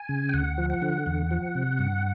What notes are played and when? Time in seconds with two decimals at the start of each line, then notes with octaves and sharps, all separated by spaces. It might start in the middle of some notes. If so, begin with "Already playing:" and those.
Already playing: G#5
0.09 C#3
0.29 G5
0.33 D2 F#5
0.58 F3
0.70 F#5
0.82 D3
1.06 E2
1.31 F3
1.55 C3
1.79 G2